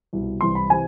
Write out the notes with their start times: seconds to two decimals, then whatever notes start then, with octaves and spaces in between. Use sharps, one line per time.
0.13 C2 B2
0.41 C2 C3 E3 C6
0.55 B5
0.70 C3 E3 G#5